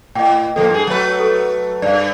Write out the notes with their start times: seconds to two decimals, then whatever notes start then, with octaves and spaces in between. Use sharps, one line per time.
0.15 A2 D#5 G5
0.56 A#2 F3 A#3 A4
0.70 G2 G#4
0.87 F#3 A3 B4
1.20 A4
1.82 G2 D5 F5